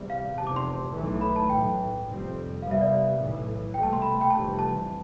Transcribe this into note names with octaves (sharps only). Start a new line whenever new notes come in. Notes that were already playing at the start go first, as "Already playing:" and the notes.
Already playing: E2 C3 G3
F5
F1 E2 C3 A5
D6
C6
B1 A2 E3 A3
B5
A5
B1 A2 E3 G5
F1 F2 C3 G3 C4
C2 C3 G3 B3 F5
E5
D5
E5
B1 A2 E3
C2 B2 A3 G5
A5
C6
B5
G5
F1 F2 C3 E3 G3 A5
A5